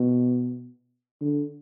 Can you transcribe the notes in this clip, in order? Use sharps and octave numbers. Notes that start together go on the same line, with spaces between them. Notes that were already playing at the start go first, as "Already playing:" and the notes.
Already playing: B2
D3